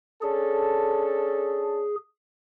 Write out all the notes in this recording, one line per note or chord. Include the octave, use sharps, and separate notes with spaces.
C#4 D4 G#4 A4